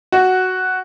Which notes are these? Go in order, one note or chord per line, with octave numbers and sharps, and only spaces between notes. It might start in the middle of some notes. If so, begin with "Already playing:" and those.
F#4